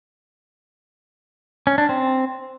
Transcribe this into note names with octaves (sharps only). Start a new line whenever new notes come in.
C#4
D4
C4